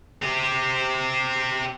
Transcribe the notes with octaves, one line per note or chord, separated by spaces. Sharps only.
C4 G4